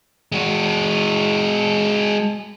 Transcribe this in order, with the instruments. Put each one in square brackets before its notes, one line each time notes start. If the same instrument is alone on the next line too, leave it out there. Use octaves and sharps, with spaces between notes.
[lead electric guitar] G#3 F#4